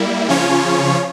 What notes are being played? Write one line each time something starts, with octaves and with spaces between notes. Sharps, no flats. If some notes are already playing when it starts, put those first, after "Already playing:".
Already playing: G3 A#3 E4
C#3 F3 C#4 F4 C#5